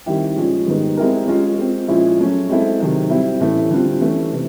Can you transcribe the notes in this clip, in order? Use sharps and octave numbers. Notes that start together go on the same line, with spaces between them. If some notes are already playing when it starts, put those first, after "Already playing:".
D#3 G3 C4 E4 G4
A#2 F3 G#3 C#4
G#2 D#3 G3 B3 D#4
G#3 C4 E4 G4 A#4
G#3 C#4 F4
G#3 C4 F4
A#2 F3 G#3 C#4 E4
F#3 A3 C#4
G#3 C4 E4 A4
C3 D#3 F#3
G3 C4 E4
A2 E3 A3 C#4
D3 G3 C4 F4
E3 A3 C#4
C3 E3